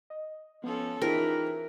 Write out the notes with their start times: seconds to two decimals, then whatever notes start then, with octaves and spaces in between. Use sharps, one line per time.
0.10 D#5
0.64 F3 B3 C#4 A4
1.02 E3 D#4 F4 G#4 A#4 C5 G5